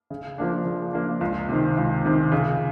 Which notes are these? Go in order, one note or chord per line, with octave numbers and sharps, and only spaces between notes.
C#3
F3 A#3 D4
C#3
F3 A#3 D4
C#2
C3 D#3
C#2
C3 D#3
C#3